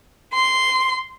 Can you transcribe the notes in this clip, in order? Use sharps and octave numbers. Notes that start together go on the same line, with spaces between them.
C6